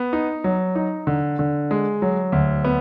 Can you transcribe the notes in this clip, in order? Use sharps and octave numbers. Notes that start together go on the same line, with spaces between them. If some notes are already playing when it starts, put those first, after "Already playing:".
Already playing: B3
D#4
F#3
D#4
D3
D3
G#3
F#3
D2
B3